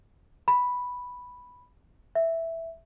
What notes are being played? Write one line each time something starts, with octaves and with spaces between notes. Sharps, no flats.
B5
E5